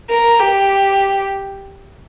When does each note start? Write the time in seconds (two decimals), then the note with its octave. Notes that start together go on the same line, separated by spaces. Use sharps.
0.10 A#4
0.40 G4